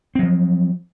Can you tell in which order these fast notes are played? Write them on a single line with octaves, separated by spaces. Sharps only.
C4 F#3 F3